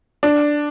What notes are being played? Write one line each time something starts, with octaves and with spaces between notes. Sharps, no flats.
D4